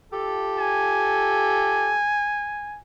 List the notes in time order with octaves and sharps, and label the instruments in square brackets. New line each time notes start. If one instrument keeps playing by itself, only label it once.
[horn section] F4 G4 A4
[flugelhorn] G#5